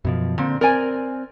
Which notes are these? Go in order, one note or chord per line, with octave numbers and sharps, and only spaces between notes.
F#2 B2 F3
A#2 D3 C4
C4 A#4 D5 G#5